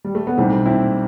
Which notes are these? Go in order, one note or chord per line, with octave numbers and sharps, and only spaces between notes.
G3
A3
B3
B1 A2 G3 A3 C4
C4 E4